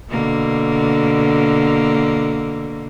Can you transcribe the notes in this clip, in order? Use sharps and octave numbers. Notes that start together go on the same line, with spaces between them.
B2 D3 A#3